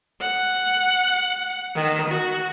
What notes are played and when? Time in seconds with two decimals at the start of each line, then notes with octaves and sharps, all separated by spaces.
0.21 F#5
1.75 D#3
2.09 F#4